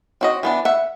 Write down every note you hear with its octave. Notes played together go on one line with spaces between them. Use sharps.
C4 F#4 D#5
E3 B3 D4
E5 F#5